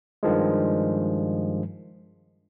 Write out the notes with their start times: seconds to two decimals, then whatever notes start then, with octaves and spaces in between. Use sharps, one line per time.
0.23 G2 D#3 F3 G#3